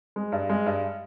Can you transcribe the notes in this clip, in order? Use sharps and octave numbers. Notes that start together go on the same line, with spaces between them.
G#3
G2
G#3
G2